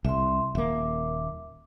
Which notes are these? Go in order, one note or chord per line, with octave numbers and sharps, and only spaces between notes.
C2 E5 C6
D#1 A#3 E5 D6